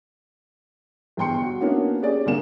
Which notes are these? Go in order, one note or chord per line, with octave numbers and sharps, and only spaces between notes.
G1 E2 G5 C6 C#7
F#4
A#3 B3 C#4 D4 E4 F#4
C#4 G4 G#4 D5
C2 D3 A#3 E7